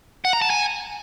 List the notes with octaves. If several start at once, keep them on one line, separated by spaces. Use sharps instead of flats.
F#5
A#5
A5
G#5